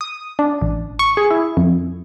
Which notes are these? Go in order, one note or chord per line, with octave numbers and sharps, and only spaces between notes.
D#6
D4
A1
C#6
G#4
E4
F2